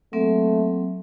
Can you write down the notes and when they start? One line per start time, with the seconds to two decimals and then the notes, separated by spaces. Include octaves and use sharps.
0.13 F#3 A3 A#3 C4